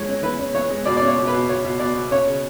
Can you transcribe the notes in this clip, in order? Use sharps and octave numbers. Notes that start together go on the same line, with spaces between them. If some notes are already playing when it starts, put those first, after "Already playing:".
Already playing: E3 G#3 C#5
C#4
E3 B4
C#4
E3 C#5
G#3
B2 D5
D5
C#4
C#5
B2
B4
B2
B2 C#5
B2
B2 D5
B2
C#4 C#5
C#3